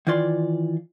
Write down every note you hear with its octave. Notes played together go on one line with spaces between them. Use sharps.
D#3 E3 F4 D5 C6